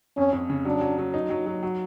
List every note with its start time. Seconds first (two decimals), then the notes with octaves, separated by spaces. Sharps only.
0.17 F2 C#4
0.33 F2
0.50 C#3
0.65 F#3 D4
0.81 F#3
0.98 F#3
1.14 D#4
1.30 F#3
1.46 F#3
1.63 F#3